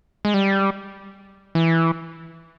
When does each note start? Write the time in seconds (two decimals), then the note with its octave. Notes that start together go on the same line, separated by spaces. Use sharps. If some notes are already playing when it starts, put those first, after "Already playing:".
0.25 G#3
0.34 G3
1.55 E3